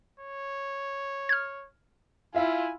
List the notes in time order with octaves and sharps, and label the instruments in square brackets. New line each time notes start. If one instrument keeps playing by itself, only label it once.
[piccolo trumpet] C#5
[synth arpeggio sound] F6 G#6
[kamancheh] E4 F4 [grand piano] E5 F5 [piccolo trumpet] G#5